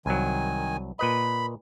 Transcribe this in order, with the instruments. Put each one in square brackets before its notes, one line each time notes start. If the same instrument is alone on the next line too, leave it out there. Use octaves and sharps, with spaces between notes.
[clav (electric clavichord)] C2 F#3 [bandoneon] D#3 G#5
[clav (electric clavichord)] A#2 B4 D#5 [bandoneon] B5